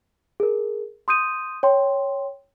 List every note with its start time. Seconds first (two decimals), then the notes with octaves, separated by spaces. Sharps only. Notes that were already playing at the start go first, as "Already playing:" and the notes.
0.40 G#4 A#4
1.08 C6 D#6 G6 D#7
1.63 C#5 G5 C6